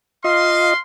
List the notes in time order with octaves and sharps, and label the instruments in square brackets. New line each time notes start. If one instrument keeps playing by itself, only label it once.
[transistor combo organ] F4 D#5 [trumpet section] F5 C6